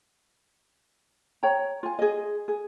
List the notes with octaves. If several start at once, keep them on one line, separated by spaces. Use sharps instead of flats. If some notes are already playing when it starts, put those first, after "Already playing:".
C#5 G5 A#5
F4 G#5
G#4 D#5
G#4